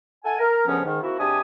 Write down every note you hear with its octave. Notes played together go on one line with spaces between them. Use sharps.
A4 E5 F#5 G#5
A#4
D2 G2 C#3 F3 B3 C#4
G#2 D#3
A#3 C4 E4 F#4
C3 G#3 D4 G4 G#5 D#6